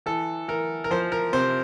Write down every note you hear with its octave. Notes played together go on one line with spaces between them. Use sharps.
E3 A4
E3 A#4
A#4
F3 C5
A#4
C3 C5